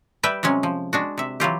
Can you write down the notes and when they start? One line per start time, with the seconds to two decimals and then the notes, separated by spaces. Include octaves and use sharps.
0.23 G3 B4 E5 G5
0.43 C3 F#3 G#3 C#4
0.63 F3
0.93 G#3 D4 F#4
1.18 C3 E5
1.40 E3 F#3 F4 G4